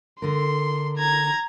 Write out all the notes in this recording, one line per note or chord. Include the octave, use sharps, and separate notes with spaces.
D3 A#4 C6
A#5 G#6